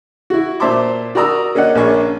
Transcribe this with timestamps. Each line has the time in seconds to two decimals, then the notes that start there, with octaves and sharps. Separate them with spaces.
0.30 E4 F#4
0.60 A#2 C5 E5 A5 C6 D6
1.15 F#4 A#4 D5 A#5 D#6 E6
1.55 A#3 C#4 D5 D#5 F#5
1.75 A#1 C#3 A#3 C#4 G#5 C#6